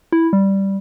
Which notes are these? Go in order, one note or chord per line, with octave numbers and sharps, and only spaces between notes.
E4
G3